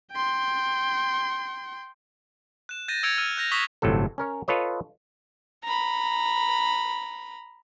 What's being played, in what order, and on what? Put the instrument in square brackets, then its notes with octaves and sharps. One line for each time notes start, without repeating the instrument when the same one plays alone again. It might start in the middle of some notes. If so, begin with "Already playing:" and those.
[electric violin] G5 C6
[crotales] F#6 E7
G6 A6 A#6 D#7
E6 G#6 C#7 D7 F7
E6 F6 D#7
F#6 G6 A#6 F7
C#6 D#6 F#6 B6 F7 G7
[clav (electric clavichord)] G1 A2 C3 F#3 A4
C#4 A#4 C#5
F4 A4 B4 C#5 D#5
[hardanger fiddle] A#5 B5